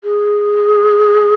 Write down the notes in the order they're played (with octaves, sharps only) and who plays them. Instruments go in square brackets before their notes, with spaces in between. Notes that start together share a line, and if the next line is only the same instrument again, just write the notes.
[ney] G#4